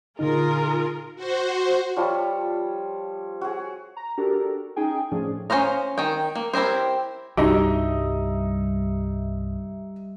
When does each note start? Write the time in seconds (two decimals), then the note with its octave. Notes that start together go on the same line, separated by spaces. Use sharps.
0.19 A#2 D3 D#4 F4 G#4 A#4
1.16 F#4 C5
1.96 F3 G3 C#5
3.41 F#4 G#4
3.97 A#5
4.18 D4 F#4 G4 A4 A#4
4.76 C#4 D#4 G#4 G5 G#5
5.11 A2 F3 C#4 D4 G#4
5.50 C#4 F#4 C5 F5 A#5
5.98 D#3 G5
6.35 A#3
6.53 C4 E4 G4 A#4 C5
7.37 C2 G2 G3 D4 D#4 F#4 D#5 E5